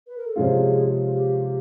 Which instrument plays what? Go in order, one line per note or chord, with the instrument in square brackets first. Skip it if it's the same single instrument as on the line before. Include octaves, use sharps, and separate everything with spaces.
[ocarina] B4
A#4
A4
[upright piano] C3 F3 G#3 C#4 F4 [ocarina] G#4
[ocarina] G4